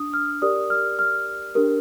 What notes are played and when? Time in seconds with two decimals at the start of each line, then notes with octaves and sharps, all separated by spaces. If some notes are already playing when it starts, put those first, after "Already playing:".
Already playing: D4 D#6
0.14 F6
0.42 G4 A#4 D5 D#6
0.70 F6
0.99 F6
1.55 D4 G4 A#4